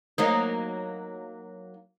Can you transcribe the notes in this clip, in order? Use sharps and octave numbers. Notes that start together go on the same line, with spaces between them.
F#3 A#3 D#4